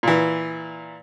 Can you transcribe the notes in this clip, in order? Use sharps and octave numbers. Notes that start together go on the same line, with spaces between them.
A#2 E3